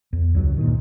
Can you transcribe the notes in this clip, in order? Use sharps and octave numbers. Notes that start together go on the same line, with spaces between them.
E2
C#2 G2 F#3
A#2 D#3